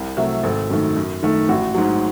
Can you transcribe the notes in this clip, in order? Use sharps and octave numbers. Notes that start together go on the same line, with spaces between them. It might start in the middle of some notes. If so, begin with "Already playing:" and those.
Already playing: C2
C3 F#3 A3 E5
G#1 A4
F#2 D#3 A3
F#2
D#3 A3
A1 F#4
G#2 F#3